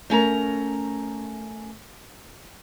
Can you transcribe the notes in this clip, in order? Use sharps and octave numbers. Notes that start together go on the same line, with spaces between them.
A3 C#4 A#4 A#5